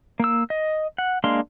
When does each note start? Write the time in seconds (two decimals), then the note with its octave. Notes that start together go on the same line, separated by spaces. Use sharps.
0.20 A#3 E6
0.50 D#5
0.98 F#5
1.24 G#3 A#3 D4 F5 C6